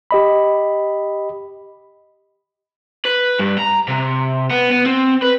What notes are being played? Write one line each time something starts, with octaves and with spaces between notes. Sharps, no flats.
G4 D#5 B5
B4
G2
A#5
C3
B3
B3
C4
B4